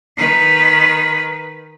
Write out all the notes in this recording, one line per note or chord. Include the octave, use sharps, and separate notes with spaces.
D#3 B4